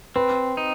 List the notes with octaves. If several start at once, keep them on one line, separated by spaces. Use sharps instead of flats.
C4 B4
D#4